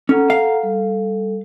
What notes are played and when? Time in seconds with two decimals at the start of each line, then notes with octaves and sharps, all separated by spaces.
0.09 C#4 A4 F#5 A#5
0.30 F5
0.63 G3 A4